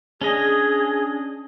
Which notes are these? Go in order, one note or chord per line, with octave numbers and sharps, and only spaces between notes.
C#4 D4 G#4 D#5